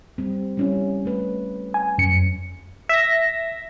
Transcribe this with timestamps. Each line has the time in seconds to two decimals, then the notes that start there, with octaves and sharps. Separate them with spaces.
0.18 G3 C4
0.57 G3 C#4 E4
1.05 A3 B4
1.74 G#5
1.98 F#2 C#4 C#7
2.89 E5 A#6